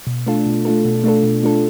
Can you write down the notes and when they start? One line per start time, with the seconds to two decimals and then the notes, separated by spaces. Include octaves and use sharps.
0.07 B2
0.27 A3 D4 F4 A4
0.46 B2
0.65 A3 D4 F4 A4
0.85 B2
1.04 A3 D4 F4 A4
1.23 B2
1.43 A3 D4 F4 A4